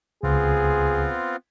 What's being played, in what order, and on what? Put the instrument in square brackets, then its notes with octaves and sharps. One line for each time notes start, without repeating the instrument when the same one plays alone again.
[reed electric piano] C#2 [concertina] B3 C4 F4 [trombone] G#4